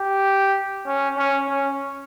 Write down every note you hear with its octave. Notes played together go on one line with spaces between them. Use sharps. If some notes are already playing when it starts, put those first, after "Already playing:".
Already playing: G4
C#4
C#4
C#4